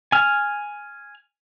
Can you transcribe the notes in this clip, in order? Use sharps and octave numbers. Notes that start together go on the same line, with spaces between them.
G#5 F6